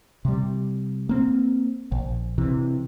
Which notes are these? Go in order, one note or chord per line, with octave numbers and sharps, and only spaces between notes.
C3 G3
A#3 C4
A#1
C3 E3